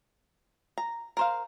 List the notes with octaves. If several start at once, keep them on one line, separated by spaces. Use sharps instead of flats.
A#5
A#4 C5 F5